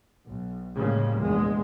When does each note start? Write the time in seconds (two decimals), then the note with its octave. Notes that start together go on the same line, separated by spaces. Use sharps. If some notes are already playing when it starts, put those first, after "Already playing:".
0.25 B1
0.76 A2 C#3 F3 G3 G#3 A#3
1.17 F1 A#1 E2 G#3